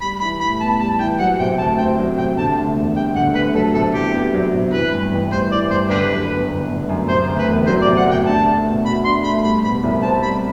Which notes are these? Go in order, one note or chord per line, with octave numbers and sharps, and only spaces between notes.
G3 B5
E3 B5
A2 B5
B3 A5
G3 A5
E3 G5
F#3 F#5
C3 G5
D2 A5
C4 G5
F#3
C3 G5
D3 A5
D2
E1
G3 G5
D3 F#5
D2 B4
F#3 A4
C3 A4
E2 G4
B3
F#3
C3
E3 B4
G2
A1
G3 C5
E3 D5
G2 C5
D3 D4 G4 B4
F#2
G1
G1
D3
F#2
C3 C5
D2
B4
E1
F#3 C5
D5
C3
F#5
D2 G5
D4 A5
A3
B2
F#4 B5
D4 C6
A3 B5
G3 B5
B2 B5
C2
C4 A5
G3 B5